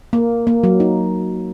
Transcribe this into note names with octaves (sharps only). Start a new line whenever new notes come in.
A#3
A#3
F#3
D#4